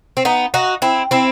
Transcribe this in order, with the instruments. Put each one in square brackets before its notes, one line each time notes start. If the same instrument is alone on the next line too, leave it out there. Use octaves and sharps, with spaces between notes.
[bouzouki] C4
B3 D#4
D#4 F#4
C4 E4
C4 E4